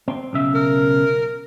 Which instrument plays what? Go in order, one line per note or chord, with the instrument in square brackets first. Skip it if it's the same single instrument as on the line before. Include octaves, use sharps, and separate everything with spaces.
[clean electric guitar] C4
B1 C#3 E5
[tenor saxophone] A#4